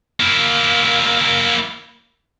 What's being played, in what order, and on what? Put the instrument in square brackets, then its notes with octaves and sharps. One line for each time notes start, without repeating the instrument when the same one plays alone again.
[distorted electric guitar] A#3 E4